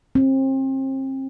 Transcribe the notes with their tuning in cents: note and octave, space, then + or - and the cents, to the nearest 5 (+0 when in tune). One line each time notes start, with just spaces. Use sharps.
C4 +35